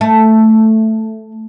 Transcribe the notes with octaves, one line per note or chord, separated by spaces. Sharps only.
A3